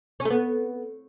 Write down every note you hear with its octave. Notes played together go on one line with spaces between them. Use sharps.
C#4
A3
B3